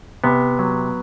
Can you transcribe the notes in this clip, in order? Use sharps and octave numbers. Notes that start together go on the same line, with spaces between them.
C3 B3
F#3